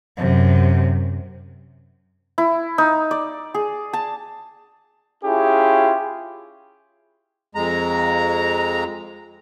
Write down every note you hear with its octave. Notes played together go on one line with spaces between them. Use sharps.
F#2 C3
E4
D#4
D5
G#4
A5
C#4 E4 F4 G4 G#4
F2 G#3 A#5